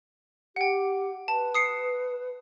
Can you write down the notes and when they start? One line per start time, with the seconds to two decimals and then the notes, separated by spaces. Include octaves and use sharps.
0.56 G4 F#5 G5
1.28 B4 A5
1.54 D#6 C7 C#7